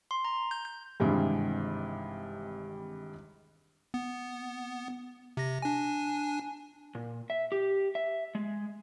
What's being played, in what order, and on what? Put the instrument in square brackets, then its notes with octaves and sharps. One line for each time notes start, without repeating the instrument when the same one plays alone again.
[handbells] C6
A#5
G6
G6
[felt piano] G#1 G2 C3 E3 G3 G#3
[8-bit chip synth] B3
C3 A#6
D4 G#5
[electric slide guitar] A#2
E5
G4
E5
G#3